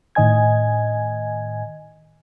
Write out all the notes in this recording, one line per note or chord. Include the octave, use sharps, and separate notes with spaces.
A2 D#3 D#5 G#5 G#6